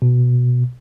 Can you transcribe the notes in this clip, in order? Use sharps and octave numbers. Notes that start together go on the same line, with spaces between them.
B2